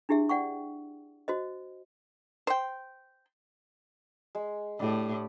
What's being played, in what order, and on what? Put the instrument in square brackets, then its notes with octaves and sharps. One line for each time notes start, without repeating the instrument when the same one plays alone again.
[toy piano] D4 E4 G4 G#4 E5
D5 F#5 G5 C#6
F#4 C5 D#5
[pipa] C5 G5
[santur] G#3
[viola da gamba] A2 [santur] D4 G4